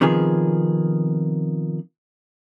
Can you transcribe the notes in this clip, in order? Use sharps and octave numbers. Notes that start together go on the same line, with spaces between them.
C3 D#3 F3 B3 G#4